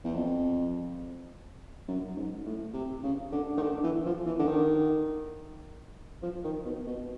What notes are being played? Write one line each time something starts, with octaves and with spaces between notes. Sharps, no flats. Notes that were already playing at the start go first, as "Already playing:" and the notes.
E2
F2
F#2
G#2
A2
C3
C#3
D3
D#3
D3
E3
F3
E3
D3
D#3
F3
D#3
B2
B2